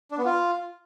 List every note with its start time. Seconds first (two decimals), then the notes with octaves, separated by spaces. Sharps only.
0.11 D4
0.18 B3
0.25 F4